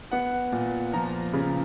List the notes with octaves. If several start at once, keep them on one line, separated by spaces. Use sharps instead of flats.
B3 F#5
A#2
F3 A#5
C#3